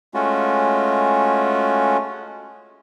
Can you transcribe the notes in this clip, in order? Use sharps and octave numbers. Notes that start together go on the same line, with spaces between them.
G#3 A3 C#4 F4 F#4